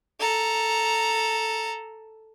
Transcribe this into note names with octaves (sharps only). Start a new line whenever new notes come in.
A4 A#5